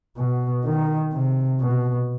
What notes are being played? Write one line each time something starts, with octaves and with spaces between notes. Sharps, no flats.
B2
D#3
C3
B2